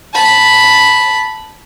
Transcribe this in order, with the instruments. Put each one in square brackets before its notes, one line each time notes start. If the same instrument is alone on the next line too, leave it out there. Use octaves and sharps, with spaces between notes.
[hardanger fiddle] A5 B5